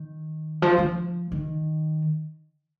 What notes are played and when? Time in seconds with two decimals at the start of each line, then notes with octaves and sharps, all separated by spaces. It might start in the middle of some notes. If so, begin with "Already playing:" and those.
Already playing: D#3
0.62 F3
0.78 F3
1.32 D#3